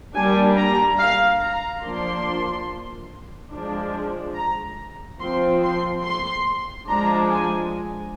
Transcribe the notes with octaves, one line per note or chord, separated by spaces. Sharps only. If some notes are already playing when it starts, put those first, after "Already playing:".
G3 A#3 D4 G#5
A#5
F5
A#5
F3 A#3 D4 C6
F3 G#3 D4
A#5
F3 C4 C6
C6
C6
F3 G#3 D4 A#5
G#5